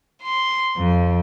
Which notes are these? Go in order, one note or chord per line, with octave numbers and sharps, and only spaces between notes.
C6
F2